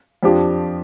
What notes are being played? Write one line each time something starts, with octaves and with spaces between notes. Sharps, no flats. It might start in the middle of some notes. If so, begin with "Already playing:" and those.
F2 F3 D4 G4